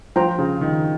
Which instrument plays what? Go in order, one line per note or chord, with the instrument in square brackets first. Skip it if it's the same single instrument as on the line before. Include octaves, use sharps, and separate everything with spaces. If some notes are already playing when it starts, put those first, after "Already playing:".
[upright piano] F3 [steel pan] F4 C5 G5 A#5
[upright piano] C#3
D#3